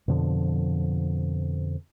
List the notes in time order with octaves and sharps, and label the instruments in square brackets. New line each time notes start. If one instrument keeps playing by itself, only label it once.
[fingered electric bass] F2 B2 D3 F3